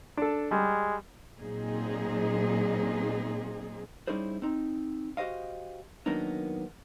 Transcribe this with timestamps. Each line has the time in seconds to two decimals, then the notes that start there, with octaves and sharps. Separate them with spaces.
0.17 D4 A4
0.51 G3 G#3
1.40 A#2 F#3 C4 D#4 G#4
4.07 G3 C#4 D#4 E4 G#4 C5
4.42 C4 D#4
5.17 F#4 G4 C5 D#5 F5
6.06 D#3 F#3 A#3 B3 D4 D#4